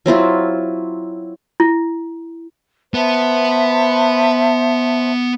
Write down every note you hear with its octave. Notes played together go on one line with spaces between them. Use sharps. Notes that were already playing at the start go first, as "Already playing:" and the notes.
F#3 C4 E4 F4
E4
B3 C5 E5 A5